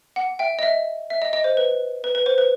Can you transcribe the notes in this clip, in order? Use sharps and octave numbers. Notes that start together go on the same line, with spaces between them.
F#5
E5 G5
D#5
E5
E5
D#5
D#5
C5
B4
B4
B4
C5
B4